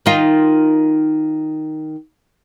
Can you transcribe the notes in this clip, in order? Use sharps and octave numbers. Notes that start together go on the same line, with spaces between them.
D#3 D#4 F4